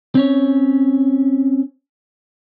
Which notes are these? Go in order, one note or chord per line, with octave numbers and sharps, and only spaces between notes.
C4 C#4 C#5